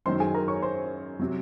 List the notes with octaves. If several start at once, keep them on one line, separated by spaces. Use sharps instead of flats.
F#2 D#3 F#3 C5 C6
G#4 G#5
A#4 A#5
C#5 C#6
C5 C6
C3 F#3